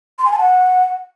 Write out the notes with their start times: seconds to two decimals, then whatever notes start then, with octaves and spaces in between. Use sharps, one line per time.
0.19 C6
0.25 G#5
0.32 A5
0.39 F#5